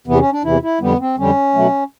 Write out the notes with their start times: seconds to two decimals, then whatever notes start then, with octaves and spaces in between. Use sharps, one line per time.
0.07 E2 C3 E3 B3
0.19 C#4
0.32 D4
0.44 E2 C3 E3 E4
0.62 E4
0.81 F2 D3 G3 B3
0.99 C4
1.17 F2 D3 G3 C#4
1.54 B2 F#3 A3